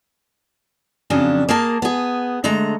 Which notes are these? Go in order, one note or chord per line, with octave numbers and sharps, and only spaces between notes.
F2 C#3 F#3 D4
A#3 G#4 A#4 A5
B3 G#4
D3 G#3 A3 A#5